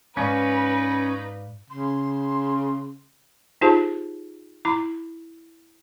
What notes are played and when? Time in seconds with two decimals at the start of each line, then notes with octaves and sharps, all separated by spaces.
0.17 G#2 C#4 D#4 B4 D5 F5
1.70 C#3 C6
3.61 D#4 F4 G4 G#4 C5 A5
4.65 E4 A#5 D6